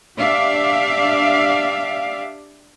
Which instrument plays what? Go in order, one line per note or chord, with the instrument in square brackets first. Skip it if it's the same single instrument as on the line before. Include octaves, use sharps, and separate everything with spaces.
[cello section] D4 G4 D5 E5 F5